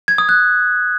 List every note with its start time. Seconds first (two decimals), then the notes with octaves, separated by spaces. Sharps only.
0.08 G#6
0.18 D#6
0.29 F#6